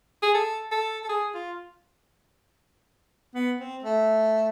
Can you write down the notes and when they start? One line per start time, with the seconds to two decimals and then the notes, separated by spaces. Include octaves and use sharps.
0.23 G#4
0.34 A4
0.71 A4
1.04 A4
1.09 G#4
1.34 F4
3.34 B3
3.59 C4
3.84 A3